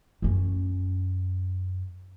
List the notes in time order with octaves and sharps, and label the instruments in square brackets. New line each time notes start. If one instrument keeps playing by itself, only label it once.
[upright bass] F#2 C#4